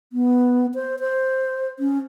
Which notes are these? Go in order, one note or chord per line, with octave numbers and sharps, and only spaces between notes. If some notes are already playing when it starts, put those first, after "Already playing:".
B3
C5
C5
C#4